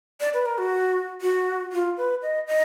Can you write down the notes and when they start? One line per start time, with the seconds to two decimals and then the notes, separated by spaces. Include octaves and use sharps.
0.20 D5
0.34 B4
0.46 A#4
0.58 F#4
1.22 F#4
1.72 F4
1.97 B4
2.22 D#5
2.47 D#5